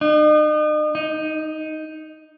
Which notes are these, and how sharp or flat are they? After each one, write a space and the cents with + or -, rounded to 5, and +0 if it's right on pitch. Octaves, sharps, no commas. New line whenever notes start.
D#4 -40
D#4 +5